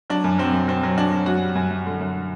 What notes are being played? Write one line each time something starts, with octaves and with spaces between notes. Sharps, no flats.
F#3 D4
F#2
F#3 C4
F#2
F#3 C4
F#3
F#3 D4
F#3
F#2 F#4
G3
F#2
F#2
D3
F#2